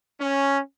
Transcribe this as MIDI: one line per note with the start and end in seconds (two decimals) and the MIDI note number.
0.20 0.58 61